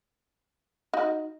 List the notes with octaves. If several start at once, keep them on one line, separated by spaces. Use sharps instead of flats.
D#4 F#4